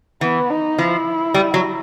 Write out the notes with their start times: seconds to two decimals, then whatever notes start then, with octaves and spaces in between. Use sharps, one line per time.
0.21 E3 B3
0.50 D#4
0.79 F3 E4
1.34 G3
1.54 F#3